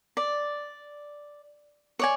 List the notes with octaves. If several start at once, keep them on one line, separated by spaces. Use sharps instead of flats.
D5
C#5 D5 G#5